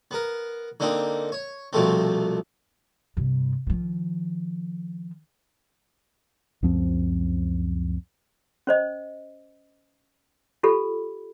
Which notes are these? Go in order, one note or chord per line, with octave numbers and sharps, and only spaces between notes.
B3 A#4
D3 A#3 C4 D#4
C#5
C2 B2 F3 A3 C4
G2 C3
D#3 F3
C#2 F#2 F3 C4
C#4 C5 D#5
F4 G4 A4 B5